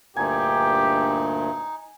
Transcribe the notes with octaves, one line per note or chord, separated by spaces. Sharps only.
D2 G2 A#2 D#4 G4 G#5